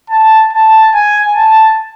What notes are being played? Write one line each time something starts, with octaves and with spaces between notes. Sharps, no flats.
A5
A5
G#5
A5